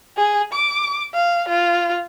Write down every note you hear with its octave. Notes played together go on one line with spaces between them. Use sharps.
G#4
D6
F5
F4